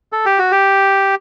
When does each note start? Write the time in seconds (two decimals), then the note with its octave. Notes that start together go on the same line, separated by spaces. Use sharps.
0.12 A4
0.26 G4
0.39 F#4
0.51 G4